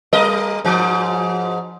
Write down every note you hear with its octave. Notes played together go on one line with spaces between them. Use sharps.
G3 A#4 D#5
G#2 F3